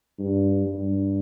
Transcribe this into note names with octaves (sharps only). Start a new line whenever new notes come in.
G2
G2